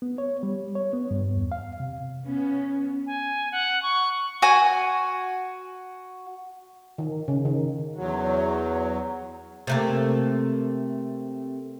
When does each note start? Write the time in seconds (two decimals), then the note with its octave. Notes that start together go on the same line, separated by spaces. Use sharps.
0.02 B3
0.18 C#5
0.43 G3
0.75 C#5
0.93 B3
1.11 G2
1.36 E2
1.52 F5
1.80 C3
2.24 B3 C#4
3.06 G#5
3.52 F#5
3.83 C#6
4.42 F#4 G#5
6.98 D#3
7.28 C#3
7.45 D#3
7.96 E2 F#3
9.67 C3 A3 A#3